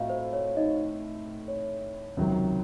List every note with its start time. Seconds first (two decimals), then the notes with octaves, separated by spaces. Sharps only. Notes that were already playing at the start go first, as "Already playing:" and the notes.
Already playing: A2 A3 C4 F4 F#4 D#5 F5
0.09 C5
0.33 C#5
0.56 D#4 D#5
1.48 C#5
2.17 C#2 C3 D#3 F#3